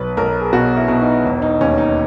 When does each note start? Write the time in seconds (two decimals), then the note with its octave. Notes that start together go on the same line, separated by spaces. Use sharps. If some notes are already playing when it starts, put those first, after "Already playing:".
Already playing: B1 B4
0.17 B1 A#4
0.41 G#4
0.53 B2 F#4
0.77 E4
0.88 B2
1.01 D#4
1.25 E1
1.42 D#4
1.61 D#2 C#4
1.78 D#4